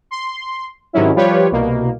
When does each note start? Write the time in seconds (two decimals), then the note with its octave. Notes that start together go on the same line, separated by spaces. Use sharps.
0.11 C6
0.93 G#2 C3 D#3 F#3 C#4 E4
1.15 F3 G3 F4 G4 B4 C#5
1.51 C2 B2 A#3